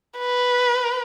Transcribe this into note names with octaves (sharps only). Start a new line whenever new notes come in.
B4